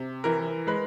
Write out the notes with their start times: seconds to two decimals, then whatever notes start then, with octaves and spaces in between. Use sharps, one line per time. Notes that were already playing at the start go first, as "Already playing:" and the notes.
Already playing: C3
0.24 E3 A#4
0.67 G#3 B4